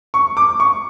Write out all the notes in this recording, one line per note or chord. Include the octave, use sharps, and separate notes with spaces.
C#6
D6
C#6